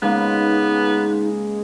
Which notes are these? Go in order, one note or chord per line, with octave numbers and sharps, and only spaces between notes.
C#3 G#3 A#3 B3 D#4 B4